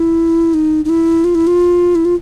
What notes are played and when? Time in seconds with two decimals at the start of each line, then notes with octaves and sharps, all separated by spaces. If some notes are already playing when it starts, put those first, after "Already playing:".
Already playing: E4
0.54 D#4
0.85 D#4
0.89 E4
1.24 F4
1.35 E4
1.47 F4
1.95 E4
2.05 F4